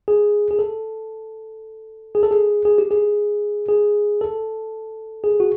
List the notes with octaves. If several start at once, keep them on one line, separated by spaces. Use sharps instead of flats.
G#4
G#4
A4
G#4
A4
G#4
G#4
G4
G#4
G#4
A4
G#4
F#4